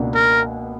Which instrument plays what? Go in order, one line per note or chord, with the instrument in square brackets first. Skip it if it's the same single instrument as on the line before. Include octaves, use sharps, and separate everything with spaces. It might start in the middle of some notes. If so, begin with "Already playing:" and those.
Already playing: [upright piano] C#2 B2 A#3 D4 F#4
[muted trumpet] A#4